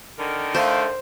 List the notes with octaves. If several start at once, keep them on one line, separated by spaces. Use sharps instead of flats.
D3 D#3 A#4
A3 C5 F5